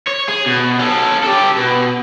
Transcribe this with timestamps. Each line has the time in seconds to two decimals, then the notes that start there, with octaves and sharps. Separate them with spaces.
0.08 C#5
0.29 G#4
0.47 B2
0.79 C#4 A4
1.23 G4 A4
1.56 B2